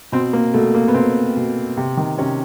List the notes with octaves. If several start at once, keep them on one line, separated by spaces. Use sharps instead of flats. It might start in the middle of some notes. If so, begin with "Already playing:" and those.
B2 C4
A#3
B2 A3
A#3
B3
B2 C4
B2
C3
D#3
C3 C#4